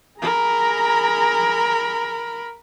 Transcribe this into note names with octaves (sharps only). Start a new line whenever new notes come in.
G#4 A#4 A#5 B5